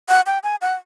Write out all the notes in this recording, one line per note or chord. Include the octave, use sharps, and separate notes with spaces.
F#5
G5
G#5
F#5